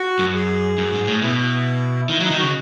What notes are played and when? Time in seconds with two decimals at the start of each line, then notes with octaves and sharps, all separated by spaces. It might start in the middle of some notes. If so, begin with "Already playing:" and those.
Already playing: F#4
0.19 F#2
0.35 G#4
0.78 F#2
0.93 G#2
1.07 A2
1.22 B2 E4
2.09 D#3 E4
2.20 F#3 D#4
2.31 D#3
2.38 C#3 F#4